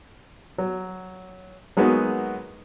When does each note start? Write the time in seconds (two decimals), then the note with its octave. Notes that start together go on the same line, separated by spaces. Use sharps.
0.58 F#3
1.77 F#3 G#3 A#3 B3 D#4 F#4